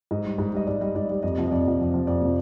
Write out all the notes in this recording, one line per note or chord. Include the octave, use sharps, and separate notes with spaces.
G#2 D#5
G3
G#2
G3 D#5
G#2 D5
G3 D#5
G#2 D5
G3 D#5
F2 D#5
C3 F3
D#5
F2 D5
C3 F3
F2
C3 F3
F2 D5
C3 F3